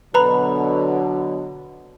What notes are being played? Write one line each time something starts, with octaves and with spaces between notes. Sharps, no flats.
B2 D3 F#3 B4 A#5 B5